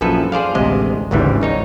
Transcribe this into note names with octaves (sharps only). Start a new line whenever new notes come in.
A#1 F#2 F3 A4 B4 G#5
G#4 C5 D5 F5
A1 D2 C3 G#3 D#5
G#1 D2 G#2 C#3 E3 G3
G#1 D#4 C#5